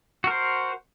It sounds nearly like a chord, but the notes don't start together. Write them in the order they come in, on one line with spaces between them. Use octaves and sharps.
F#4 A#4 C5